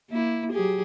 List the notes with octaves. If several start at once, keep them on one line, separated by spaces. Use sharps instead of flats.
A#3 E4
F#3 G4 G#4